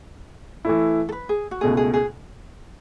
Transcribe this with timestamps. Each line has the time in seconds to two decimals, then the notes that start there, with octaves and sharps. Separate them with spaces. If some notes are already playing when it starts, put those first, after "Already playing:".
0.65 E3 A3 E4
1.09 A4
1.12 B4
1.29 G#4
1.51 F#4
1.61 C#2 B2 A3 G#4
1.77 G#4
1.94 G#4